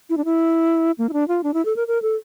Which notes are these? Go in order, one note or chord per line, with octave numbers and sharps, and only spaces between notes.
E4
D4
E4
A#3
E4
D4
F4
D4
E4
A4
A#4
A#4
A4